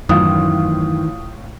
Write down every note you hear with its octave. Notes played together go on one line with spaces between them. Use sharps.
F#2 A2 D#3 E3 F4 D#6